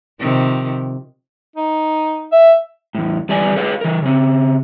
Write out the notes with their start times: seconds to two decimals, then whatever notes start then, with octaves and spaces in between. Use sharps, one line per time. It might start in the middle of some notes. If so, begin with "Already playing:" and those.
0.20 C3 D#3 F3
1.56 D#4
2.32 E5
2.95 E2 A2
3.29 E2 G3 B4 D5 G#5
3.56 G#4 B4 C#5 F5
3.81 E3 A#4
4.02 C#3 C4